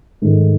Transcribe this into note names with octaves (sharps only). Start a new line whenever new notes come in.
G#2 D#3 A3